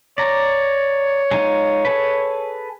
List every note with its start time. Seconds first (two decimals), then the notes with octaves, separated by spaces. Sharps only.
0.18 C#5 D5 A#5
1.31 G#3 D#4 F4
1.85 G#4 A4 B4